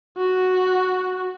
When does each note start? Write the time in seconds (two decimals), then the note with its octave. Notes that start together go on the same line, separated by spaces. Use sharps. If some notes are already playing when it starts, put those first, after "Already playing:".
0.18 F#4